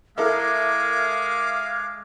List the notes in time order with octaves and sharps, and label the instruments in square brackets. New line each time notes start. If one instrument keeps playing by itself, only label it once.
[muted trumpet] G#3 [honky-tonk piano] E4 A4 A#4 [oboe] F5 [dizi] D6